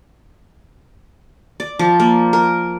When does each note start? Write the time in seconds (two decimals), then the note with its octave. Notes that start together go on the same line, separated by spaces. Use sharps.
1.60 D5
1.79 F3
2.00 A#3
2.33 A#4